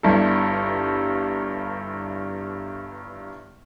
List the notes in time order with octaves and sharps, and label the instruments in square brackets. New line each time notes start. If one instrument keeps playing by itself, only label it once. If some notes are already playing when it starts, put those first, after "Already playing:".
[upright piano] G1 G2 G3 E4 A4